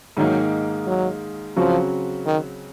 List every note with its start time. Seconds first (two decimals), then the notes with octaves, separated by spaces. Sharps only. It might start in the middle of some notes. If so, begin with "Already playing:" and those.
0.17 G#2 D#3 F#3 A#3 D#4
0.86 F#3
1.56 C#3 F3 F#3 C4 F#4
2.26 D#3